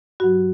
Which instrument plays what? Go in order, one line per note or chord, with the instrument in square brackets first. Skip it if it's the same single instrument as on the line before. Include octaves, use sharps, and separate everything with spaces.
[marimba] G2 F#3 F#4